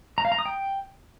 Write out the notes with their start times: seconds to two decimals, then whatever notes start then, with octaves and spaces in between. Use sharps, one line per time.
0.18 A#5
0.25 F5
0.32 A#5
0.39 D#6
0.46 G5